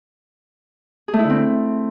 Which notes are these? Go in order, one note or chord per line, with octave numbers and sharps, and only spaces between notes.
G#4
A3
E4
D3
C4